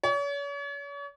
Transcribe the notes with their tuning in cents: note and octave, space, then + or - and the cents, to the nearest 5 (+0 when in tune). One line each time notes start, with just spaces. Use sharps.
C#5 +40